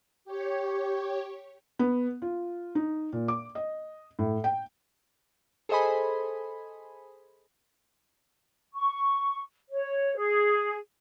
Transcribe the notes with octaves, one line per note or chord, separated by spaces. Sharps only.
G4 C#5
B3
F4
D#4
A#2
D6
D#5
A2
G5
G#4 A4 C5 D#5 G#5 B5
C#6
C#5
G#4